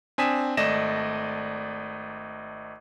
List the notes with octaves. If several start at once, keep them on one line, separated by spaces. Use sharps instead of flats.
C4 D4 G#5 D#6 B6 E7
G#1 A3 D5 D#5 A#6 E7